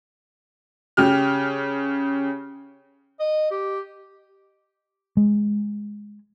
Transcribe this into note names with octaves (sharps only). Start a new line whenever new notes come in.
C#3 G4 F6
D#5
G4
G#3